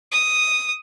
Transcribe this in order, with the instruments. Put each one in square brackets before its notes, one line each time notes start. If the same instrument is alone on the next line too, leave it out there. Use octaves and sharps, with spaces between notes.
[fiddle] D#6